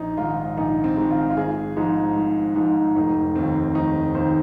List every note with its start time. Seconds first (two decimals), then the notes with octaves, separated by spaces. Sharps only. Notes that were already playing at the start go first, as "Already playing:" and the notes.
Already playing: A#1 D#4
0.18 G#2 D#3 F4
0.57 A#1 D#4
0.84 C4
0.97 G#2 D#3
1.11 F4
1.30 F4
1.37 G#1 G#4
1.77 G#2 F3 D#4
2.16 G#1
2.56 G#2 F3 D#4
2.96 F1 D#4
3.35 D#2 D#3 C4
3.75 F1 D#4
4.15 D#2 D#3 C5